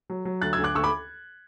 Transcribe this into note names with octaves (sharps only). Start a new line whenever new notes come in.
F#3
F#3
D2 F#6 A6
E6 G#6
D2
D6 F#6
D2 C#6 E6
B5 D6